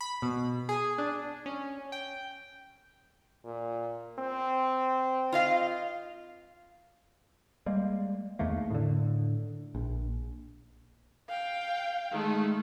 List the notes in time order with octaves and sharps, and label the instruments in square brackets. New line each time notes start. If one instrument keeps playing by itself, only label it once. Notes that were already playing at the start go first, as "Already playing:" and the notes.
[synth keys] B5
B2
G#4
D4
C#4
G5
[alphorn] A#2
C4
[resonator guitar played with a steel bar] F4 D#5 F5
[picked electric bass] G3 G#3 A#3
E2 D#3 A3 A#3
A2 D3
A#1
[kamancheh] F5 G5
[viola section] D#3 G#3 A3